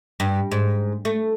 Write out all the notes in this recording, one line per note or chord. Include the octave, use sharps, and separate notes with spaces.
G2
G#2
A3